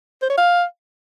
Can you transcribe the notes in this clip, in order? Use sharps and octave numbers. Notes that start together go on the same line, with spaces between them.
C5
C#5
F5